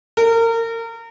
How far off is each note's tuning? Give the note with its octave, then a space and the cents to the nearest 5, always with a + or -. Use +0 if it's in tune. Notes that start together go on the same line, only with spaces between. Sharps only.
A#4 -30